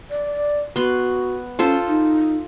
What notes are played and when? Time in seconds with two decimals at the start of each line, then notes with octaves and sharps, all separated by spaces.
0.10 D5
0.76 B3 F#4 C6
1.59 C#4 F4 A4 C5
1.87 D#4